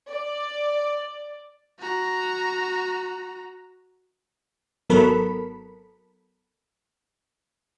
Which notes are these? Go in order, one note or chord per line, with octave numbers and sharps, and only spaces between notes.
D5
F#4 A#5
G#1 F#3 B3 A4 A#4 B5